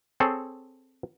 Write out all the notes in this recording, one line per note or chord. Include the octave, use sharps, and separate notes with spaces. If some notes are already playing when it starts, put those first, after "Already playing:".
C4 G#4 A4 C#5